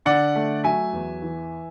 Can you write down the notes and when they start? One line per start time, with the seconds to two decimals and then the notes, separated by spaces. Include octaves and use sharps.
0.05 D3 D5 F#5
0.35 A3
0.64 F#3 E5 G#5
0.93 E2
1.22 E3